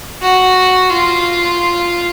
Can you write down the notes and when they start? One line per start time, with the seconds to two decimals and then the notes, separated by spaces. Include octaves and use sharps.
0.22 F#4
0.90 F4